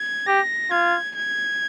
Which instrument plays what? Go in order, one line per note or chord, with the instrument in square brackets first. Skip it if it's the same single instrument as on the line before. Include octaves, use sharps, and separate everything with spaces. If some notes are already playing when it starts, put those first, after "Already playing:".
Already playing: [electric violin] G#6
[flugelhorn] G4 [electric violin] A#6
[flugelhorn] F4 [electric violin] G#6
[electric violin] G#6